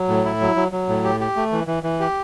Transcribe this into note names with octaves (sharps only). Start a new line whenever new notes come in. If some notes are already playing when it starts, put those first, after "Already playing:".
Already playing: F#3
A2
E4
F#3
F#3
F#3
A2
G4
G4
A3
E3
E3
E3
G4